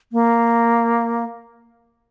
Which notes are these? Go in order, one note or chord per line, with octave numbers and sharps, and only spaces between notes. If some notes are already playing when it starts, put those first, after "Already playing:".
A#3